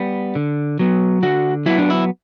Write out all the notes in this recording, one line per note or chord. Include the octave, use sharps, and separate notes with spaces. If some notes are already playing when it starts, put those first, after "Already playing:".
Already playing: G3 B3
D3
F#3 B3
D3 F#4
F#3 B3 E4
D4
E4